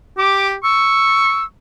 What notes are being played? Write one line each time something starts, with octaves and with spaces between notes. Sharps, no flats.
G4 D6
C#6 E6